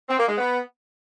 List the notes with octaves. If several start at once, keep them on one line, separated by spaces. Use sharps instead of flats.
C4
A#3
G#3
B3